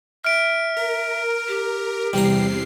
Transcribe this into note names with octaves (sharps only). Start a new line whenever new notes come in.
E5 F6 D7
A#4
G4
E2 C3 G3 A#5 C7